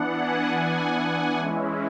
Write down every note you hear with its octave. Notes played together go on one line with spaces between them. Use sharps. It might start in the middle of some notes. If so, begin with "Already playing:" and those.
Already playing: E3 B3 D4 F#5
G#5
F#5
G#5
E3 G#3 C#4 E4